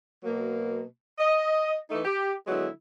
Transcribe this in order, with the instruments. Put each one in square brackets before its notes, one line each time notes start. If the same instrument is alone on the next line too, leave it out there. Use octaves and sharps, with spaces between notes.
[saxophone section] B2 F#3 A#3
D#5
E3 A3 D#4
G4
D3 F#3 G#3 B3 E4